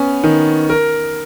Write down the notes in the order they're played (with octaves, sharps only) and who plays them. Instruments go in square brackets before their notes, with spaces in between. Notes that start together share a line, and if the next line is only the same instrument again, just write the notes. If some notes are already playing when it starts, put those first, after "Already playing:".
Already playing: [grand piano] B3 C#4
D#3
A#4